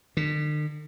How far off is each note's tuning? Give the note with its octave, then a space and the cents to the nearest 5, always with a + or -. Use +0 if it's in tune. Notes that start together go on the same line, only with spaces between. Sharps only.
D3 +45